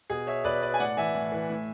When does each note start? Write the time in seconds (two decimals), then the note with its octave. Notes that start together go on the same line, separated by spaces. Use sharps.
0.10 B2 G#4
0.27 C#5 E5
0.44 B2 B4 D5
0.62 B4 D5
0.74 G#5
0.80 A2 D5 F#5
0.97 E3 E5 G#5
1.15 A2
1.32 E3
1.50 A2